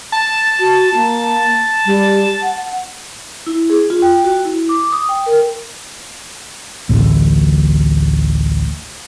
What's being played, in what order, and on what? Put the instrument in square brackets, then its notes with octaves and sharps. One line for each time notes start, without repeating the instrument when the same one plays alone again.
[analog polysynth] A5
[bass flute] F#4
A#3
G3
F#5
[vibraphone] E4
G#4
F4
G5
F#4
E4
D6
D#6
G5
A#4
[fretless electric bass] A1 D2 A2